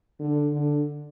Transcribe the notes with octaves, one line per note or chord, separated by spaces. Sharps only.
D3
D3